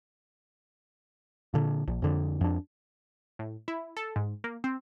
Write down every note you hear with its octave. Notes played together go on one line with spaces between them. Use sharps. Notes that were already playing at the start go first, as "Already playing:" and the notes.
A#2 D3
A#1
F2 D3
F2 D4
A2
E4
A4
G#2
A#3
C4